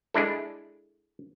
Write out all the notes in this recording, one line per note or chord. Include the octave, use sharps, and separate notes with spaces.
G#3 D4 E4 A4